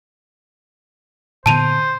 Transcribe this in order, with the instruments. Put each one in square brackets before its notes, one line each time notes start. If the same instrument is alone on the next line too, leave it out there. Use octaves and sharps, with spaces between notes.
[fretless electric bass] A#2 D3 B3 [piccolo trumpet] C5 [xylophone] A5 D#7 F7